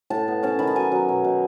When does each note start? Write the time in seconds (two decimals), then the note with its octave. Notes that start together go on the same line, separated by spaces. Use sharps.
0.10 A2 A5
0.28 B3
0.43 C#4 A5
0.59 D#3 B5
0.67 A5
0.75 F#3 G#5
0.92 F#3
1.09 B2
1.24 B2